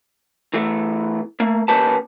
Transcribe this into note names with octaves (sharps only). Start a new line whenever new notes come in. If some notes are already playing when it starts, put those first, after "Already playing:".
E2 E3 A3
A3 A#3
E2 A#3 C#4 G4 B4 A5